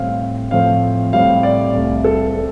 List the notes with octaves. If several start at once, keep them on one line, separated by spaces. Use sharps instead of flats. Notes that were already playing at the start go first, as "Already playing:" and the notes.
Already playing: A2 G3 C4 F5
A2 F3 A3 C4 F5
A2 G3 C4 F5
D5
C2 C3 A3
A4
C4